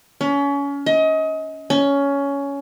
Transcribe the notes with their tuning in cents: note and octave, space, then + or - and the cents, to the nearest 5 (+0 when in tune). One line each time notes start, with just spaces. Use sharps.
C#4 +30
D#5 +30
C#4 +15